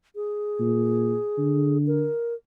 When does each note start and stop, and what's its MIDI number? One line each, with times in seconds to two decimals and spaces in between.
0.16 1.78 68
0.60 1.16 46
1.38 2.09 50
1.87 2.34 70